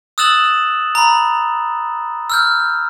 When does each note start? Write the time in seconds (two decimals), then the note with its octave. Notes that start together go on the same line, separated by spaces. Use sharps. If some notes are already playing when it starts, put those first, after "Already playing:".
0.18 D#6 E6 F#6 A6 E7 F#7
0.95 A#5 B5
2.30 E6 F6 G6